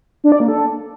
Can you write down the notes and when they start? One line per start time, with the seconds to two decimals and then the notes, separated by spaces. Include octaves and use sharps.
0.24 D4
0.32 D5
0.40 A#3
0.48 A4